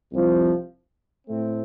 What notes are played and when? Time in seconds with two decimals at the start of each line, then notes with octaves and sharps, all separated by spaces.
0.12 C2 C3 F3
1.26 A2 A3 C4